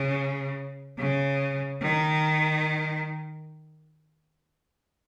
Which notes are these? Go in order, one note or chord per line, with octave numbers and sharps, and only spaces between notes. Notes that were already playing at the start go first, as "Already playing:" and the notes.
Already playing: C#3
C#3
D#3